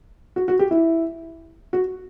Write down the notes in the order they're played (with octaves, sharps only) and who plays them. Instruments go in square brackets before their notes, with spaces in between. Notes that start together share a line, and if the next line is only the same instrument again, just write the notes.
[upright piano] F#4
F#4
G4
E4
F#4